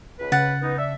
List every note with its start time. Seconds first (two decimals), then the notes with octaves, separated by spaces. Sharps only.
0.19 C#2 B4
0.32 C#3 F#5 A6
0.61 B3 D#4
0.77 D4 E5